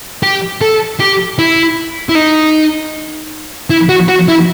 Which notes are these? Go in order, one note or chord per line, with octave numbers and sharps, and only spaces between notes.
G4
A4
G4
E4
E4
D#4
E4
F#4
F#4
E4